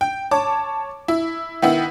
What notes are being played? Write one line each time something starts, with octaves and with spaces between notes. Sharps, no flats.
G5
C#5 A5 D6
E4
D#3 B3 E4